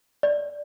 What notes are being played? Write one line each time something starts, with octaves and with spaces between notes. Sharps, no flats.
D5